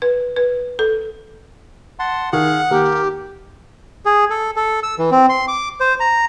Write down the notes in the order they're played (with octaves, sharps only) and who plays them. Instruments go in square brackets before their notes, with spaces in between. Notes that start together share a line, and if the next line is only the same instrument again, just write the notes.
[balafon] B4
B4
A4
[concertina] F#5 A5 C6
[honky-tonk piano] D#3 [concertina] G#4 F5 [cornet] F#5
[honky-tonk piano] D#2 [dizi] G4 [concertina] A#4
[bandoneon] G#4
A4
A4
E6
E3
C4
C6
D6
C5
A#5